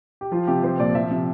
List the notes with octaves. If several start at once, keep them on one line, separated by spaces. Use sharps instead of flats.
G4
F3 F4
C3 G4
F3 C5
A#2 D5
F3 E5
C3